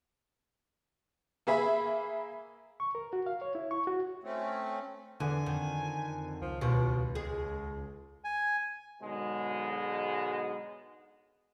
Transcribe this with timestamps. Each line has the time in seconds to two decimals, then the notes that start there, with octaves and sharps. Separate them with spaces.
1.47 A#3 G#4 E5 B5
2.80 C#6
2.95 A#4
3.13 F#4
3.26 F5
3.42 C#5
3.55 E4
3.71 C#6
3.87 F#4
4.24 A3 C4 C#4
5.20 E2 D3 G#5
5.46 F2 D#3
6.41 C#2 F3
6.61 D#2 B2 F4
7.15 G#3 G#4
8.24 G#5
9.02 G#2 B2 D3 F#3 G#3